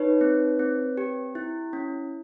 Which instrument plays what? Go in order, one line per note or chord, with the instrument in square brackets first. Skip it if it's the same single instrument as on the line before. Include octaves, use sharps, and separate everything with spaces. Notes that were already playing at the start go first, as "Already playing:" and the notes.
Already playing: [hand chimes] D#4 B4 C#5
C4
C4
G4
E4
C#4